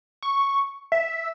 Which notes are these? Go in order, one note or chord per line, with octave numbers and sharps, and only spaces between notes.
C#6
E5